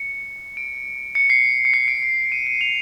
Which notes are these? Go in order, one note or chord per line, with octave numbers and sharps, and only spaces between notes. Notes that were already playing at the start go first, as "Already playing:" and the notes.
Already playing: C#7
D7
C#7
C7
C#7
C7
D7
D7
D#7
D#7
F7